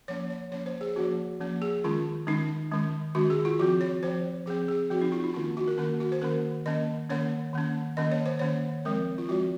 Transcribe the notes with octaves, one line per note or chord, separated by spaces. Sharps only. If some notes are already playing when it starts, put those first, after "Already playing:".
F3 A#3 C#4 C#5
C#5
F3 A#3 C#4 C#5
C5
G#4
F3 A#3 C#4 F#4
F3 A#3 C#4
G#4
D#3 G#3 C#4 F4
D#3 G#3 C#4 D#4
D#3 G#3 C#4
D#3 G#3 C#4 F#4
G#4
F4
F3 C4 F#4
C#5
F3 C4 C5
F3 C4 G#4
G#4
F3 C4 F#4
D#4
F4
D#4
D#3 A#3 C#4 F4
F#4
A#4
D#3 A#3 C#4 A#4
F#4
C5
D#3 A#3 C#4 A#4
D#3 A#3 C#4 D#5
D#3 A#3 C#4 C#5
D#3 A#3 C#4
D#3 A#3 C#4 D#5
C#5
C5
D#3 A#3 C#4 C#5
F3 G#3 C4 A#4
F4
F3 G#3 C4 F#4